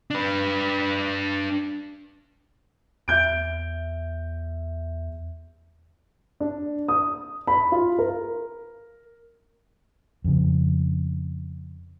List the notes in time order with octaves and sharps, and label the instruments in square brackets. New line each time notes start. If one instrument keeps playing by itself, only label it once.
[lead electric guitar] D4 B4
[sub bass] E2 [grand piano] E5 G6 D7
[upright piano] D4
D#6
B5
F4
A#4
[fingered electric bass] F2 C#3